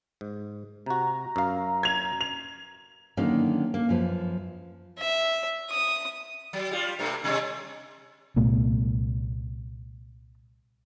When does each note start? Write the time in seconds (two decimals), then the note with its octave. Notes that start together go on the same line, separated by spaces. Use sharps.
0.21 G#2
0.86 C3 F#4 A#5
1.36 F#2 F5
1.83 G#6 F7
2.21 F7
3.17 D3 D#3 F#3 A#3 C#4 D#4
3.74 A#3
3.89 F#2 F3 B4
4.99 E5
5.70 D#6
6.53 F#3
6.71 G3 F4
6.99 G2 C3 A3
7.24 B2 G3 C#4
8.36 C2 A#2 A3 B3